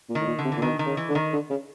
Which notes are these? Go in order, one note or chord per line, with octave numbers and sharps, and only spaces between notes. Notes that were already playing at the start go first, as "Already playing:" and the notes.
A#2
D#3
A2
A#2
D3
C3
E3
A#2
B2 D#3
D#3
C#3
E3
D3
D#3
D3
C#3